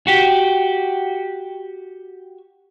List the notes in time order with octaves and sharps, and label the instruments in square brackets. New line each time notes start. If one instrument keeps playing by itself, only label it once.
[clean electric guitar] F#4 G4